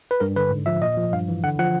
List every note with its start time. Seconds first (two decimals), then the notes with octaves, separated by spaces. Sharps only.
0.11 B4
0.20 G2 A#4
0.36 D3 B4
0.51 G#2
0.66 F3 E5
0.82 A#2 D#5
0.97 F3
1.13 G2 F5
1.28 E3
1.44 D3 F#5
1.59 F3 F#5